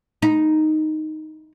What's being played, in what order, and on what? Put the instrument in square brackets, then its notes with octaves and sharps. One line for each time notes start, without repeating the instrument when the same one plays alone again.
[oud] D#4